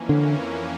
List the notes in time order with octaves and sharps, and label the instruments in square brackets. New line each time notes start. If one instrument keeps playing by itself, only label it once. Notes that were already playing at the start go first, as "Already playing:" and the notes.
Already playing: [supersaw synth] F2 E3 A#3 C#4
[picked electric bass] D3